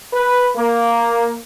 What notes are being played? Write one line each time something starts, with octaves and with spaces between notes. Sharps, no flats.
B4
A#3